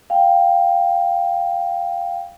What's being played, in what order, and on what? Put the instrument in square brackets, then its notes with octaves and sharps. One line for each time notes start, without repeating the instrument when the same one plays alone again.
[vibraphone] F5 G5